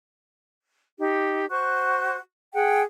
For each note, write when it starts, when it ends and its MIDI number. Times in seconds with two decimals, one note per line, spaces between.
0.99 1.46 63
0.99 1.46 67
1.49 2.16 66
1.49 2.16 72
1.49 2.16 85
1.49 2.16 90
2.53 2.82 68
2.53 2.82 78
2.53 2.82 79